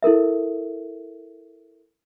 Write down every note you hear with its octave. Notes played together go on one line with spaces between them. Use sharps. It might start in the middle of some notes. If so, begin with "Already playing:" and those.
E4 A4 A#4 E5